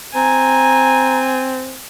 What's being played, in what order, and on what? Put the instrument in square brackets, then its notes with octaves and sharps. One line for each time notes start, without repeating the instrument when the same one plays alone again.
[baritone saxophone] C4 [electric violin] G#5 [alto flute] A#5